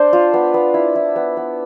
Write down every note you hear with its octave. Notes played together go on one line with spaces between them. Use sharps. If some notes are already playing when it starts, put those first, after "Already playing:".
Already playing: D4 C5 D5
F4
B3
B3
E4
E4
B3
B3